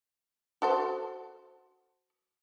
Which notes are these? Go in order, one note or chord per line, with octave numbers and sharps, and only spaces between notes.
F#4 A4 C5